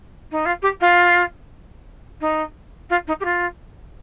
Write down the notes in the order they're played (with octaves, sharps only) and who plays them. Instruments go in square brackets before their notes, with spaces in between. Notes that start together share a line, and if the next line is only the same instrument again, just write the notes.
[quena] D#4
F4
G4
F4
D#4
F4
D#4
G4
F4